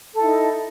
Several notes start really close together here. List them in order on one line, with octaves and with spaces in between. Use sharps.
A4 E4 D#4